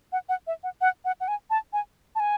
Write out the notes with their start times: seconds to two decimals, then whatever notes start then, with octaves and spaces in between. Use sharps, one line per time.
0.12 F#5
0.29 F#5
0.47 E5
0.63 F#5
0.81 F#5
1.05 F#5
1.21 F#5
1.28 G#5
1.50 A5
1.73 G#5
2.15 A5
2.20 G#5